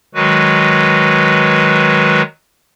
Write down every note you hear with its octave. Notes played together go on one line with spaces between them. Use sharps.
D#3 F#3 G#3 F#4 B4